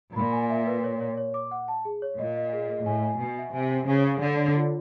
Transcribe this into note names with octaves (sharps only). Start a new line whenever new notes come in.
A#2 B5
G#5
E5
B4
C#5
C#5
C#5
D6
F#5
A5
G#4
C#5
A#2 D#5
D#5
G#4
D#5
A2 G#5
G#5
B2 G#5
E5
C3 G#5
C5
C#3 G#5
F5
D3 C#5
C#5
F4